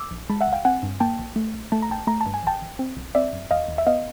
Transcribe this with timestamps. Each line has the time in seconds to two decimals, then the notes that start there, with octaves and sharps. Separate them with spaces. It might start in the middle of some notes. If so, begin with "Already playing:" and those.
Already playing: D6 E6
0.11 A#1
0.29 G#3 A5 B5
0.41 E5 F#5
0.47 C#2
0.53 F5 G5
0.65 C4 F#5 G#5
0.83 G2
1.00 A#3 G5 A5
1.19 A#1
1.36 A3
1.54 A#1
1.72 A3 A5
1.82 A#5
1.90 A#1 G5 A5
2.07 A3 A#5
2.21 A5
2.26 G2
2.34 G#5
2.43 A1 G5 A5
2.62 A1
2.79 C4
2.97 B1
3.15 C4 D5 E5
3.33 F#2
3.51 D#2 D#5 F5
3.68 D#2
3.78 E5
3.87 B3 D#5 F5